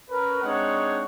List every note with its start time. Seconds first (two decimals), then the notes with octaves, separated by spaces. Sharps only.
0.10 C#4 A#4 B4
0.42 G#3 C4 D4 D#4 C#5 F#5